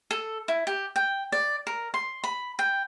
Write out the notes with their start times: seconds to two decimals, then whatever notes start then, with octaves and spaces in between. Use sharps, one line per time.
0.11 A4
0.48 E4
0.67 G4
0.96 G5
1.32 D5
1.67 A#4
1.94 C6
2.24 B5
2.59 G5